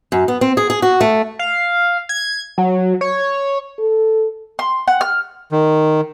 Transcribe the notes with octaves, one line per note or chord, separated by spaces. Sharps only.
F#2
B3
C4
G#4
G#4
F#4
A3
F5
G#6
F#3
C#5
A4
C6
F#5
F6
D#3